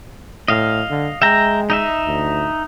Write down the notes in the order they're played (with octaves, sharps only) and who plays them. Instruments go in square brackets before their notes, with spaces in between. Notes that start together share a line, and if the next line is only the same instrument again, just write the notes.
[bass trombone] A2 [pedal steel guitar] D#5 F5
[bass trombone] D3
[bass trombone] G#3 [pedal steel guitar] E5 G5 A#5
[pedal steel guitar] D#4 D#5 E5
[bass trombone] D2